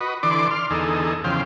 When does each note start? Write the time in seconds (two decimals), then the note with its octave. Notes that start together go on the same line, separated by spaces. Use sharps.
0.01 F#4 B4 D#5
0.23 D3 E3 D5 C6 D6
0.51 C6 F6
0.71 E2 D3 D#4 G#4 A4
1.24 E2 C#3 F3 C5 F5 G5